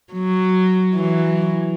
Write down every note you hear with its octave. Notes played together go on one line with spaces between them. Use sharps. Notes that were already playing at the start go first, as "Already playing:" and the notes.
F#3
E3 F#3